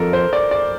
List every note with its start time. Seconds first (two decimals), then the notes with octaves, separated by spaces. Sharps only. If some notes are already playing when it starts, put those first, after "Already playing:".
Already playing: F2 A4 A#4
0.13 C5
0.33 D5
0.51 D5